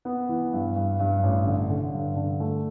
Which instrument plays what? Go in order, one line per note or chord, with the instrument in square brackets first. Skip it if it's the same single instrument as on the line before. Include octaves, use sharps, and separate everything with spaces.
[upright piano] B3
E3
G2
G2
G2
A1
D3
D3
G2
D3
A3